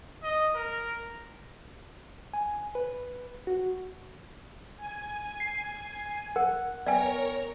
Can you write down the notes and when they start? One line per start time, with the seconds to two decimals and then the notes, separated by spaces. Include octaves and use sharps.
0.24 D#5
0.56 A#4
2.34 G#5
2.75 B4
3.47 F#4
4.77 G#5
5.40 C7
6.36 A#4 F#5
6.86 B3 A#4 C#5 D5 G5 G#5 A#5